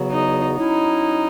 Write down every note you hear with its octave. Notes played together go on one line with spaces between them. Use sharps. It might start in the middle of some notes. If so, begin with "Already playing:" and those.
Already playing: E2 C#3 F#3 B3 F#4
D#4
F#3 C#4 D#4 E4